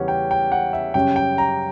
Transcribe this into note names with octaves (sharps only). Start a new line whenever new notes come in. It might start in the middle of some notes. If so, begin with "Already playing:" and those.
Already playing: E2 C#3 G3 C#4 F#5
G5
G5
F#5
E5
F#2 C#3 G3 C#4 G5
G5
A#5